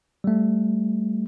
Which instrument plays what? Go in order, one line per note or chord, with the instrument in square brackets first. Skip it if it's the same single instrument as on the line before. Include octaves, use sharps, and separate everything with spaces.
[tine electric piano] G3 A3